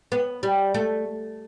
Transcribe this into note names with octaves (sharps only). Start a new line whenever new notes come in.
B3
G3
A3